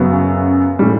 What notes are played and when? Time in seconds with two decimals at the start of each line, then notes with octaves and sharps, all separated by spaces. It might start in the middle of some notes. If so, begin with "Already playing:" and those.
Already playing: F#2 C#3 F#3 B3
0.79 A2 E3 G3